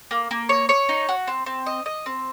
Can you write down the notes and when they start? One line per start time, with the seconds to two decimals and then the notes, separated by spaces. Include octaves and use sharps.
0.11 A#3
0.31 A#3
0.49 C#5
0.69 C#5
0.89 D#4
1.09 F#4
1.28 C4
1.46 C4
1.66 D#5
1.86 D#5
2.06 C4